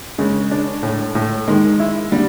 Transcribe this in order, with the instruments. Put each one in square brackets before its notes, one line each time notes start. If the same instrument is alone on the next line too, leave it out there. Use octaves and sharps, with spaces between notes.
[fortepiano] C#3 [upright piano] G#3
[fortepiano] D4
A2
A2
[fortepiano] D#3 [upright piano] G#3
[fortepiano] E4
[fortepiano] D3 [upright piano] G3